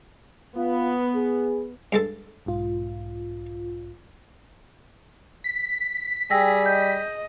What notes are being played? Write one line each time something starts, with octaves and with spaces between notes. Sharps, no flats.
B3 F4
G#4
G2 G#3 A4
B1 G#2 F4
B6
G3 G#4 G5 E6 A#6
D#5 G6